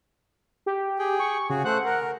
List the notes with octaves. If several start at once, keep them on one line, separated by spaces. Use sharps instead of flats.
G4
G#4 G5
C#6
C#3 F#4 G#4
A3 C5 F#5 F#6
A#4